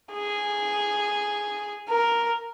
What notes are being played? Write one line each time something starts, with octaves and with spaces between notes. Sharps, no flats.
G#4
A#4